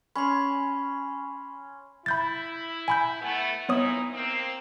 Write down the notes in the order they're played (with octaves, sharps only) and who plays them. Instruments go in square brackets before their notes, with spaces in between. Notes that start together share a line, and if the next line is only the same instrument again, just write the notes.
[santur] C#4 [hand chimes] B5 C6
[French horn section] E4 [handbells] B5 G6 A6
[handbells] G#5 B5 G6
[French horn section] A3 B3
[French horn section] A#2 D#4 E4 [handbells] B3 C#5 D#6
[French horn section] A#3 C4